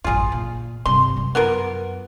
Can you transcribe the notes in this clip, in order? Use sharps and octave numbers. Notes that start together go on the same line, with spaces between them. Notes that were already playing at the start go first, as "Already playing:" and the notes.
A1 F#2 F4 G#4
A#2
G2 C3 C6
F#2
B3 F4 A#4